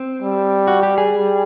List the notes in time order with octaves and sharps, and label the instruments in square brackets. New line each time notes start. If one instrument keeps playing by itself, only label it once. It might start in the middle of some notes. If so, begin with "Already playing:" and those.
Already playing: [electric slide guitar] C4
[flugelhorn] G3
[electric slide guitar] F#4
G4
G#4
[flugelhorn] G3